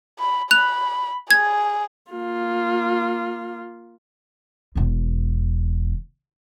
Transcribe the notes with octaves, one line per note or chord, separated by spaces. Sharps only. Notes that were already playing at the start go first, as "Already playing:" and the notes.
B5
B5 F#6 F7
G#4 G#6
A#3 F4
E1 E2